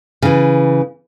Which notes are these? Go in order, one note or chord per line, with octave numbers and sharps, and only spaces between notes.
C#3 E3